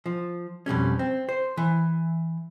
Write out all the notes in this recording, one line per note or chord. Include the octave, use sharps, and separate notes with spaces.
F3
F2 B2 G3 C#4
C4
C5
E3